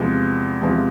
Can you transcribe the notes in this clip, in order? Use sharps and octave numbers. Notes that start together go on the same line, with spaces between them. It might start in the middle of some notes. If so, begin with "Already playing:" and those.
Already playing: E2 C3 F3 G#3
E2 C3 F3 G#3